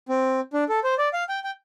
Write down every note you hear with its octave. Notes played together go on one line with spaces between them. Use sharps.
C4
D4
A4
C5
D5
F5
G5
G5